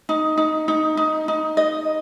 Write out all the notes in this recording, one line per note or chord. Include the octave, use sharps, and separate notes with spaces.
D#4
D#4
D#4
D#4
D#4
D#5